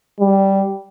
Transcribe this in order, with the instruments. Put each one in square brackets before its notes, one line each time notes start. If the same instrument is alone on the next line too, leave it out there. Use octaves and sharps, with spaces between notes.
[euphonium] G3